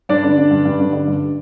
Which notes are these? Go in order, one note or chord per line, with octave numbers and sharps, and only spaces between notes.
G2 D4 D5
D3
D3
G2
G2
D3
D3
G2